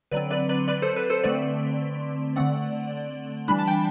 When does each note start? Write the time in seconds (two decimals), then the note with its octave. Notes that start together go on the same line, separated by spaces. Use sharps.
0.11 D3 F#3 C4 B4 D5
0.31 B4 D5
0.49 B4 D5
0.68 B4 D5
0.82 A4 C5
0.96 B4
1.10 A4 C5
1.24 D3 A3 C4 B4 D5
2.36 D3 A3 C4 D5 F#5
3.48 E3 G3 D4 B5
3.59 A5
3.67 G5